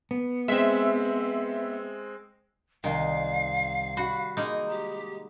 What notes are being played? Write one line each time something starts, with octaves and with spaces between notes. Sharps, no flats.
B3
G#3 C4 E5
C2 D#3 F5
F#4 B5
G#3 A#3 D#4
G4